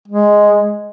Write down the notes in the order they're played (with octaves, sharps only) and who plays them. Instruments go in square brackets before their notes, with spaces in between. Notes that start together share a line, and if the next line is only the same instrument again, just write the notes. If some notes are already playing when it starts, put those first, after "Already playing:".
[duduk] G#3